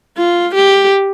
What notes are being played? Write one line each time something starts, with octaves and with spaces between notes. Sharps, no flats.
F4
G4